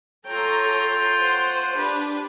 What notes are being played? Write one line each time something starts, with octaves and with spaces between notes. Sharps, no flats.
F4 A4 C#5 G5 A#5
C5 C#5 F#5
D4 G4 B4